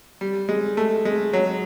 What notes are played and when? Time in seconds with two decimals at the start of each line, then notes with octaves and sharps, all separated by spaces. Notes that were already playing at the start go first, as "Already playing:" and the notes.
0.21 G3
0.49 G#3
0.77 A3
1.05 G#3
1.33 F#3